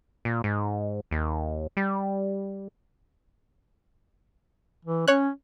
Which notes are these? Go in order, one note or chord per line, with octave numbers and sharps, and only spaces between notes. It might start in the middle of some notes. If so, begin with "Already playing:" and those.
A#2
G#2
D#2
G3
E3
C#4 C#5 F#6